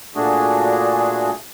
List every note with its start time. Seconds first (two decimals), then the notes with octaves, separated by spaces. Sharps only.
0.15 A#2 A3 D4 F#4 G#4